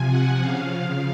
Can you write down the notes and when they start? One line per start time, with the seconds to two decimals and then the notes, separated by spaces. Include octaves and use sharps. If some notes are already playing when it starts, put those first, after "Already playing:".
Already playing: C3 F3 G#5
0.09 F#5
0.40 C#3 F3 F5